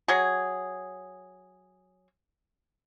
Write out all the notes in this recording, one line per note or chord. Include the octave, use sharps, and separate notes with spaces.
F#3 G#4